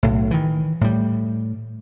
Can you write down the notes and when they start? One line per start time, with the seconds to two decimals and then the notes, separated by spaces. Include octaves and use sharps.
0.03 B1 A2
0.31 D#3 E3
0.81 A2 G3